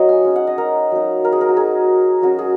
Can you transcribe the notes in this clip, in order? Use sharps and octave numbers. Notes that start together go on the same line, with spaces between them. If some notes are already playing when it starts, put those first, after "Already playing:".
Already playing: F#3 A#3 D#4 C#5 D#5 F#5
G#5
G#3 C#4
F#5
D#5
A#4
F#3 A#3 D#4
A#4
G#4
A#4
F#4
F#3 D#4 G#4
F#3 C#4 F#4
G#4